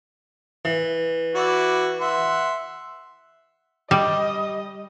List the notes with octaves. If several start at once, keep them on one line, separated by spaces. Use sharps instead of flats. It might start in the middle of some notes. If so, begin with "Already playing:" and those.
E3
E4 F#4 D5
E5 F#5 C6
G3 D#5